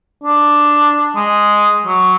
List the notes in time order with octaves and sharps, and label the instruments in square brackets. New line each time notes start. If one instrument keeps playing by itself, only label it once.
[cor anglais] D4
G#3
F#3